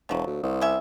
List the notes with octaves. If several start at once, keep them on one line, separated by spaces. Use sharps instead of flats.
E1 F3 F#3
D2
C2
G3 C#4 E5